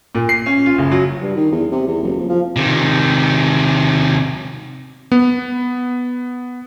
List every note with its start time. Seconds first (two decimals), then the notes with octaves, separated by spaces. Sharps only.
0.15 A#2
0.29 C7
0.46 C#4
0.66 F4
0.78 F#1
0.91 F#3
1.22 G2
1.36 D#3
1.52 E2
1.71 C3
1.87 E2
2.03 F#1
2.17 F2
2.29 F3
2.56 C3 D#3
5.12 B3